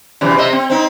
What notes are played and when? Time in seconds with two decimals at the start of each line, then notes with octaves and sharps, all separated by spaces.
0.21 F#2 C3 E3
0.38 C3 D#5 E5
0.53 C4
0.70 C4 D#4